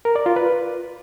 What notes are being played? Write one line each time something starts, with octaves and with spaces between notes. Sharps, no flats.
A#4
D5
F4
B4